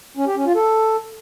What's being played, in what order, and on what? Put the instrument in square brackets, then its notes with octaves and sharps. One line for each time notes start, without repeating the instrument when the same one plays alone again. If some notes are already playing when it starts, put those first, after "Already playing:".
[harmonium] C#4
G4
C#4
F4
A4